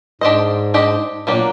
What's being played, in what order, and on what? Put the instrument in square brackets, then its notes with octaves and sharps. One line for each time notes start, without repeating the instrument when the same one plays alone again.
[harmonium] G#2 [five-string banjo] D4 G4 C5 D#5
[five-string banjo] D4 G4 C5 D#5
[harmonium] A#2 [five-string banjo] F#3 A#3 D4 G4